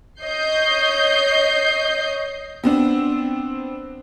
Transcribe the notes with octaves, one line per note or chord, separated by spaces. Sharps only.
C#5 D#5 G6 C7
B3 C4 D4